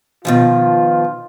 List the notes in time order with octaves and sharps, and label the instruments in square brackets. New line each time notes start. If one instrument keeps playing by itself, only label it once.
[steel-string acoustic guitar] B2 D#3 F3 [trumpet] F4